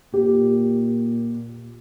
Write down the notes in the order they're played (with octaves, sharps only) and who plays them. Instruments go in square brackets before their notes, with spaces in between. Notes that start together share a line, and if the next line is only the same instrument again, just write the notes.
[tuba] A#2 [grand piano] G4